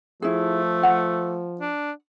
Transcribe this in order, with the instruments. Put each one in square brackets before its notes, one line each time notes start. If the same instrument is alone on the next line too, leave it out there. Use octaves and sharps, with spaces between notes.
[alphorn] F3 [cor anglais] A3 [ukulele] E4 G#4
[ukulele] F#5
[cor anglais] D4